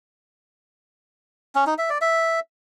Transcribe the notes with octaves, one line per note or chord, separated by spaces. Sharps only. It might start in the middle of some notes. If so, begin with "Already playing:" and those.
C#4
D#4
E5
D5
E5